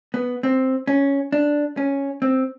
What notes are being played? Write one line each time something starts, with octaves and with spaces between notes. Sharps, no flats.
B3
C4
C#4
D4
C#4
C4